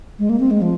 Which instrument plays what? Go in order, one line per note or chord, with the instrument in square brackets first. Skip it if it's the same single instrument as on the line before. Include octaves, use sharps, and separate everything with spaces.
[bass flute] G#3
A#3
C4
G#3
F3